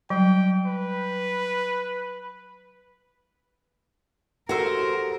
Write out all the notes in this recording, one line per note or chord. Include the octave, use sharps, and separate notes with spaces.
F#3 G3 G5
B4
F#4 G4 A4 A#4 C5 E6